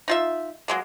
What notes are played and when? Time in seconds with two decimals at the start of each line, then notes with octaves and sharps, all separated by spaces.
0.08 D#4 F4 E5
0.68 F#3 G#3 A#3